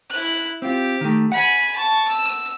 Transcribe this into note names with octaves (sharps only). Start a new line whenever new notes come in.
E4 F#6
C4 F4 G4
D#3 A3
F#5 G#5 B5
A5 C#6
E6